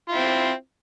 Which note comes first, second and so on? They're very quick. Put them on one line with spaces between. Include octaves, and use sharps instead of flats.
F4 E4 C4